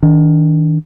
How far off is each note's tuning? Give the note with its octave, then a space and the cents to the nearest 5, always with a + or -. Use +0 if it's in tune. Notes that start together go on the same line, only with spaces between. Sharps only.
D#3 +25 D4 -15